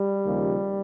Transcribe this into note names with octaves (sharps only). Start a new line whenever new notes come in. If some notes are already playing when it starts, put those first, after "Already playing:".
Already playing: G3
D#2 C#3 F3